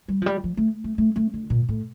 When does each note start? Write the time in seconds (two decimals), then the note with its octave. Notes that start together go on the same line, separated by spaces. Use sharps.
0.08 G3
0.22 F3
0.26 G3
0.44 F3
0.57 A3
0.84 A3
0.98 A3
1.16 A3
1.34 D3
1.50 A#2
1.69 A2